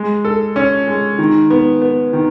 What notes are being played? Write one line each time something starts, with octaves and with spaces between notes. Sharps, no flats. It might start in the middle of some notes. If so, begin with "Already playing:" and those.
Already playing: G#3
A4
C#4
G#3
D#3
B3
B3
D#3